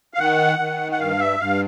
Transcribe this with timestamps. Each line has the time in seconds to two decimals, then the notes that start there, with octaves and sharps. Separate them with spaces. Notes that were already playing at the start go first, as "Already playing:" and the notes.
0.14 F5
0.19 D#3 F#5
0.59 D#3
0.92 F#5
0.99 G2 F5
1.20 E5
1.40 G2 F5